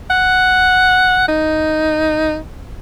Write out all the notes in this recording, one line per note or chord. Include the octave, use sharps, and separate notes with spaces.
F#5
D#4